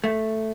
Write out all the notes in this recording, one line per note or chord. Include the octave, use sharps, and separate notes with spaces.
A3